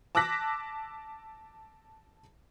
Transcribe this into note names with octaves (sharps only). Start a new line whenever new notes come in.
A5 D6 E6 F#6 A#6 B6